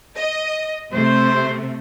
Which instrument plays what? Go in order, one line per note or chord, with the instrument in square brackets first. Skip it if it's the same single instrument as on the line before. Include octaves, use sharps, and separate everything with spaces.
[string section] D#5
[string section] C3 A3 [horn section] C5